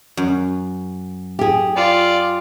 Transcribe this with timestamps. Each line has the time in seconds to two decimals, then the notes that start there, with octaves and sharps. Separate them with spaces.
0.17 F#2
1.39 G4 G#4
1.76 F4 D5